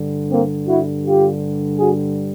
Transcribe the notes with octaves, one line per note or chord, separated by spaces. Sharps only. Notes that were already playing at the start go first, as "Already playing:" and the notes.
Already playing: G2 D3 G3
A#3 C4
E4 F#4
F4 G4
F#4 G#4